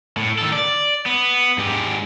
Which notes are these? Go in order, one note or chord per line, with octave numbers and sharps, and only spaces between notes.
A2
D#3 A4
D5
B3
G#2 G4